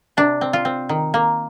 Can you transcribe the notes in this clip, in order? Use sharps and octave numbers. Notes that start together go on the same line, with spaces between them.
C3 D4
C4
F4
C4
D#3
A#3